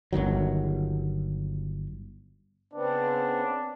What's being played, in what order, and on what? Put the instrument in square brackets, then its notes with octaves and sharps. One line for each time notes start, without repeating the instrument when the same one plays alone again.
[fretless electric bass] G1 C#2 D#3 F#3
[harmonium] C#3 B3 C4 [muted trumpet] D4